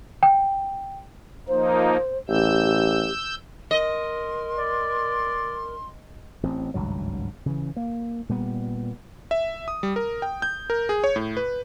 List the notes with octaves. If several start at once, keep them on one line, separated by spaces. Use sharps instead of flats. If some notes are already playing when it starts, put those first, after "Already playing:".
G5
F3 A#3 D#4 C5
A1 G4 E6 G6
A#4 D#5 C6
D5
A1 C4
G#1 C#2 G2 F#3
C#3 E3
A#3
A#2 G3 B3
E5
D#6
G3
A#4
G5
G6
A#4
G#4
C#5
A2
B4